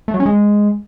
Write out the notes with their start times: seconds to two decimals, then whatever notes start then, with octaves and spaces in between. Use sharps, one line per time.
0.08 A3
0.14 F#3
0.20 C#4
0.26 G#3